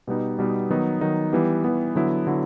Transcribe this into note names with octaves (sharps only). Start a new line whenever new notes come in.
B2 G3 B3 D#4
B2 G3 B3 D#4
D#3 F#3 B3 D#4
D#3 F#3 B3 D#4
E3 G3 B3
E3 G3 B3
D3 F#3 B3 E4
D3 F#3 B3 E4